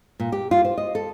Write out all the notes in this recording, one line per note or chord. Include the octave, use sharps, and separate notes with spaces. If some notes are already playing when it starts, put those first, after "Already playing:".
A#2
G4
F4
C5
D#5
A4